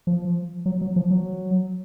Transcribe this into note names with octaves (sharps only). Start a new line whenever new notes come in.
F3
F#3
F#3
F3
F#3